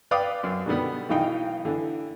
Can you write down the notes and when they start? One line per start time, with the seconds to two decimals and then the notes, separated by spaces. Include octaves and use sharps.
0.11 B4 D5 F5 G5 D6 D#6
0.43 F#2
0.66 B2 D3 D#3 G3 B3
1.09 B1 D#3 E3 D#4 F5 G5
1.65 D3 E3